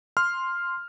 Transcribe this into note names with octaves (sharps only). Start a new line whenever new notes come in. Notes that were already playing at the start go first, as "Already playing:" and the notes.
C6 F6